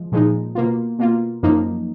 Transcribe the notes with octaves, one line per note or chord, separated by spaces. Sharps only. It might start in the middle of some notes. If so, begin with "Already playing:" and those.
Already playing: F3 G#3
A#2 F3 G#3 D#4
B2 A#3 F4
B2 A#3 F4
F#2 F3 A#3 D#4